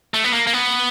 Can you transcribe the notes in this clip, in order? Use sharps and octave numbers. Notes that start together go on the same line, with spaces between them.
A3
B3
A#3
A#3
B3